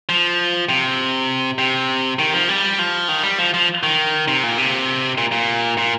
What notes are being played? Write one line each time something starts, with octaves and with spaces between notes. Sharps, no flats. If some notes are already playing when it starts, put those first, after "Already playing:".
F3
C3
C3
D#3
F3
G3
F3
D#3
G3
F3
F3
D#3
C3
A#2
C3
A#2
A#2
A#2